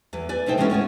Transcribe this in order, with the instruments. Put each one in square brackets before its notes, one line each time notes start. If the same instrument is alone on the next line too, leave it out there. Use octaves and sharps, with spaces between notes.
[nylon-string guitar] E2 B4
B4 D5 G#5
B2 A3 D#4 C5 G5
E3 G#3 A3 B3 C#4 E4
A2 B3 C#4 F#4